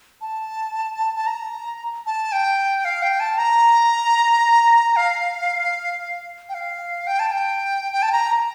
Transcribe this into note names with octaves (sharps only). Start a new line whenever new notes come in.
A5
A5
A#5
A5
G5
F5
G5
A5
A#5
F5
G5
F5
G5
A5
G5
G5
A5
A#5